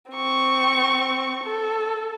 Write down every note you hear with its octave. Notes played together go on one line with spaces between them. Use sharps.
C4 C#6
A4